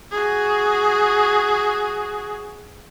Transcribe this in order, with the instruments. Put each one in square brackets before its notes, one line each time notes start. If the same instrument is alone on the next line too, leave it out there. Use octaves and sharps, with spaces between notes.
[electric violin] F#4 G#4